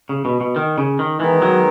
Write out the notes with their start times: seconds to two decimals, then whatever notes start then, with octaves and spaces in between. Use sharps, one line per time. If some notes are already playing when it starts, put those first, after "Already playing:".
0.09 C#3
0.25 B2
0.41 B2
0.56 D#3
0.78 C#3
0.99 D#3
1.20 D#3 E3 G#3 B3 D#4
1.42 F#3